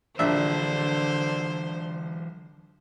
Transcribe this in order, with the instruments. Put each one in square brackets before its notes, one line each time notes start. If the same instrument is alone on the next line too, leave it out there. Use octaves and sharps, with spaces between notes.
[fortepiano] A#1 D4 E5 [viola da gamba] D3 C5 [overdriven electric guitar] E3 F#3